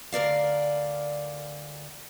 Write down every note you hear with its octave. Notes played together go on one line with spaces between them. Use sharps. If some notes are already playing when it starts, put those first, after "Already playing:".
D2 A#4 D5 F5